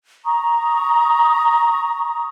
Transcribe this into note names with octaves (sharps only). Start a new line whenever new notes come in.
A#5 C#6 D#6